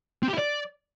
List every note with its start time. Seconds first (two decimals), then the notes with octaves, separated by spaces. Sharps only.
0.23 C4
0.28 G4
0.33 E4
0.38 D5